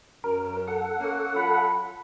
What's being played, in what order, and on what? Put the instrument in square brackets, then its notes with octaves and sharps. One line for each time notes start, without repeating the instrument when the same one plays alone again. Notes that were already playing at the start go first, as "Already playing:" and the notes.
[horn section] F#2 [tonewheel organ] A#4
[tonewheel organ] A4 F#5
[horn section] A#3 C#4
F#3 F4 B5